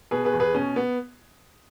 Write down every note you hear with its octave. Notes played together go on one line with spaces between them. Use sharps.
B2 G#4 B4
G#4 B4
E2
G#4 B4
B2 C#4
B3